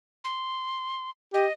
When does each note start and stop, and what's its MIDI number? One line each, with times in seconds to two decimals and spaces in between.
0.24 1.10 84
1.34 1.46 67
1.34 1.53 75